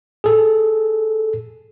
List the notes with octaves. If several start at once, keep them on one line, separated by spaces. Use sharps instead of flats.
G#4 A4